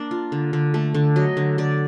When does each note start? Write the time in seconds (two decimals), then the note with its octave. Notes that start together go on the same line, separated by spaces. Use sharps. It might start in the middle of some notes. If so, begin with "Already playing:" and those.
Already playing: A#3 D4
0.11 F4
0.32 D3
0.53 D3
0.74 A3
0.94 D3
1.16 F#3 D#5
1.37 D3
1.58 D3 D5